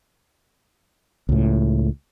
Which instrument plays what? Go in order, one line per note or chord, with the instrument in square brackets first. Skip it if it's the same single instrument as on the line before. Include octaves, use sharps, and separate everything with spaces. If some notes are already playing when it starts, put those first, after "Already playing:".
[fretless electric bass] C#2 A2